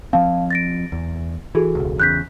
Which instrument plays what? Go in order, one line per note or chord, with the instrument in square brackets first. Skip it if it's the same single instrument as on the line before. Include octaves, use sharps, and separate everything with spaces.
[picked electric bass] F3 C4 [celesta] F5 A5
[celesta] A6 A#6 D7
[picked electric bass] E2
[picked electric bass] E3 [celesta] F#4 G#4 A4
[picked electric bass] E1 C#2
[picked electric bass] E2 C#3 [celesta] F#6 G6 B6